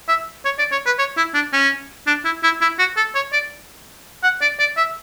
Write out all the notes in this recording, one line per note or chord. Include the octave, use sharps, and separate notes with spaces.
E5
C#5
D5
C#5
B4
C#5
E4
D4
C#4
D4
E4
E4
E4
F#4
A4
C#5
D5
F#5
D5
D5
E5